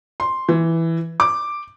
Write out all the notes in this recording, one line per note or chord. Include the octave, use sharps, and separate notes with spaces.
C6
E3
D6